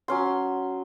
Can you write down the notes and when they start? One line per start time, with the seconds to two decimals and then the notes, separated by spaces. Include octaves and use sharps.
0.08 F#3 C#4 C6